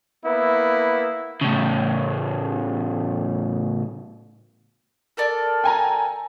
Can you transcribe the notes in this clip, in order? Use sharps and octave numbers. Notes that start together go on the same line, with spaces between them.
A#3 B3 E4
A2 C#3
A4 A#4 D5
G5 G#5 A#5